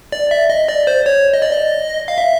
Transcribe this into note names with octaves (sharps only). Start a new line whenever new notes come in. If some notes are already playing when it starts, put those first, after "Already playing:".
D5
E5
D#5
D5
C5
C#5
D#5
D5
D#5
F5
E5